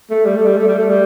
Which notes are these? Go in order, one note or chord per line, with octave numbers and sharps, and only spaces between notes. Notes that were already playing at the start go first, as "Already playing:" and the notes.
A3
G3
A3
G3
A3
G3
A3
G3